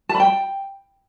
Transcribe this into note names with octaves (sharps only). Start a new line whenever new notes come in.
A5
B5
G5